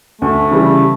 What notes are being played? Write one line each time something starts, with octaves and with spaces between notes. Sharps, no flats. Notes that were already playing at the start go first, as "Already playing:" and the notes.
D2 A3
C#3 E3 G3